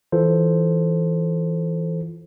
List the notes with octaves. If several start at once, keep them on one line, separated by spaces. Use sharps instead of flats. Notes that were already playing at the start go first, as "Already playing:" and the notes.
E3 F4 A4 C5